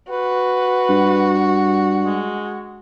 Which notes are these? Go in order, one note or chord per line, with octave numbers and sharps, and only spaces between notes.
F#4 B4
G2
G#3